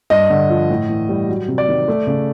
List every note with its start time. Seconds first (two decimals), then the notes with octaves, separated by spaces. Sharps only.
0.10 G2 D#5
0.30 D3
0.50 F3
0.70 A2
0.89 E3
1.09 G3
1.29 F#3
1.48 C3
1.58 D5
1.69 D#3
1.88 A3
2.07 C#3